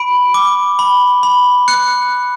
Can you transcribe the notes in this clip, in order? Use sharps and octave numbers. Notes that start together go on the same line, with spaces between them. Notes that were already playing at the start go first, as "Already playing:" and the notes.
Already playing: B5 D7
D6
B5
B5
F#6 C#7